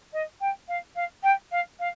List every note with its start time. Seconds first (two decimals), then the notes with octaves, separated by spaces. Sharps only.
0.12 D#5
0.40 G5
0.68 F5
0.95 F5
1.23 G5
1.51 F5
1.79 F5